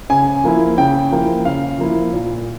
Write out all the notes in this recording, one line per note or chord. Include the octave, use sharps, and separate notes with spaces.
C#3 G#5
F3 A#3 E4
C#3 G5
F3 A#3 E4
C#3 F5
F3 A#3 E4
A#2